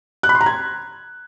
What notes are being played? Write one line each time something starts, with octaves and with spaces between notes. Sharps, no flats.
F#6
B5
C6
A#5
G#6